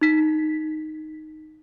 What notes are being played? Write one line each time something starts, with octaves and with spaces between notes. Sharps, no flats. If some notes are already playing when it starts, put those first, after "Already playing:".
D#4 B6